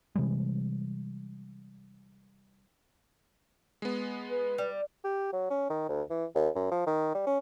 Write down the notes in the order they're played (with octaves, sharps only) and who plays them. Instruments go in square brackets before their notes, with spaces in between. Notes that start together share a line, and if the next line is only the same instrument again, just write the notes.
[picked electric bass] C3 E3 G3 G#3
[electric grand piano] G#3 B3
[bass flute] B4
[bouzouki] G3
[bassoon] G4
F#3
C#4
D#3
D2
E3
D#2
F#2
F3
D#3
G3
C#4